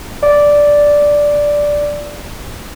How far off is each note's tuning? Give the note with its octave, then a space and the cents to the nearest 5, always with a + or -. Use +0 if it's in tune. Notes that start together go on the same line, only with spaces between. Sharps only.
D5 -5